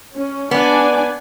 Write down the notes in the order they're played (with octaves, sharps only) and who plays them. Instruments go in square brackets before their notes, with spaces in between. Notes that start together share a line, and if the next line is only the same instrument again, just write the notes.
[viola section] C#4
[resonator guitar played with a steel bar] B3 [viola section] D4 D5 G#5